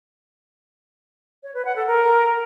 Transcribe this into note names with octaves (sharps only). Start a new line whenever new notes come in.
C#5
B4
F#5
A4
A#4